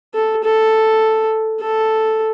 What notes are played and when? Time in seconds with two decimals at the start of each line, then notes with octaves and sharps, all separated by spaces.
0.14 A4
0.44 A4
1.61 A4